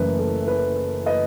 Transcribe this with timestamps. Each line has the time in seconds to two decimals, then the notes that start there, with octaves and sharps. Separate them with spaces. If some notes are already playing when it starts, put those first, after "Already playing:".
Already playing: F#1 F#2 E3 A3 B4
0.19 A4
0.48 B4
1.06 B4 D#5